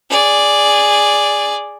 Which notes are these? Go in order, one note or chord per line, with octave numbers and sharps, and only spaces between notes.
G#4 D5